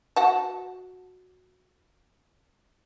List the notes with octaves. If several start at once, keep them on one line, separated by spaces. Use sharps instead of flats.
F#4 F#5 A5